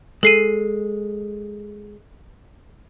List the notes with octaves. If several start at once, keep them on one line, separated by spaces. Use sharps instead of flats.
G#3 A4 C7 D#7